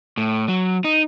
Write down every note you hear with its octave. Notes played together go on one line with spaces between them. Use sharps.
A2
F#3
D#4